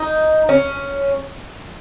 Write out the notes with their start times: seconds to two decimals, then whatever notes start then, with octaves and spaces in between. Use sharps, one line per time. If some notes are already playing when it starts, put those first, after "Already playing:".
Already playing: D#4
0.49 C#4